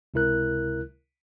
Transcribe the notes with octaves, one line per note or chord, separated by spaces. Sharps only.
C#2 C3 E4 A#4 F#6